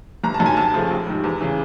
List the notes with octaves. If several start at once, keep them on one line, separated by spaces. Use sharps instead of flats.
G1 A#5
A5
F#2 D#3
G#5
D#2 A5
C#3 F3 A3
A#1
G#2 D#3 G3
E2
C#3 E3